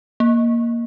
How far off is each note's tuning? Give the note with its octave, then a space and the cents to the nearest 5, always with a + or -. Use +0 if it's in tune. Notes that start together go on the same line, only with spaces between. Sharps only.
A#3 +5